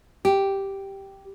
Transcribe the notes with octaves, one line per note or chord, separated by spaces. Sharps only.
G4